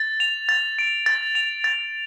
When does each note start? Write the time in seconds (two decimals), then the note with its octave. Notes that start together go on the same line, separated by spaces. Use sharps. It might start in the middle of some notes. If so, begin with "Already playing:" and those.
Already playing: A6
0.20 F7
0.49 A6
0.79 D7
1.06 A6
1.35 F7
1.64 A6